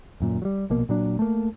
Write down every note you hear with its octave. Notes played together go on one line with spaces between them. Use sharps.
D#1 F#2 A#2
F#3 G3
A#1 B2 A#3
A#2 F#3 D4
A3 A#3